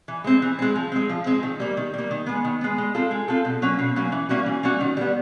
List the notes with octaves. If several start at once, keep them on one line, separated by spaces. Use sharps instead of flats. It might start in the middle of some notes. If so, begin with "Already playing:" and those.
E3
G#3 C4
E3
G#3 C4
F3
G#3 C4
F3
G#3 C4
D#3
G3 A#3
D#3
G3 A#3
D#3
G#3 B3
D#3
G#3 B3
G#3
C4 F4 A4
G#3
C4 F4 A4
B2
F#3 A#3 C#4
B2
F#3 A#3 C#4
E3
G3 A#3 C#4 F#4
E3
G3 A#3 C#4 F#4
D#3
G3 B3